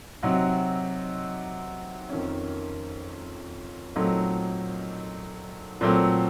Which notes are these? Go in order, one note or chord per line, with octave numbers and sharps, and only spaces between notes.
C3 F#3 C4 D#4 F#4
F2 D#3 A#3 C#4
A#2 F#3 A3 C4 D#4
A#2 F#3 A3 C4